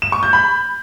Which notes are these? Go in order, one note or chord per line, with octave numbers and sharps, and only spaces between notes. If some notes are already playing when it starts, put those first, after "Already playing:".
E7
C#6
G6
B5